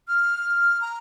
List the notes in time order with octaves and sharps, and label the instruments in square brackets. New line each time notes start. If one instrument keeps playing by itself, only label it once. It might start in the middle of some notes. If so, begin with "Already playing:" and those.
[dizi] F6
A#5